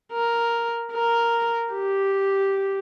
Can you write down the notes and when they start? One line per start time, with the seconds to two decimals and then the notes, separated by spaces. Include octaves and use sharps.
0.12 A#4
0.92 A#4
1.72 G4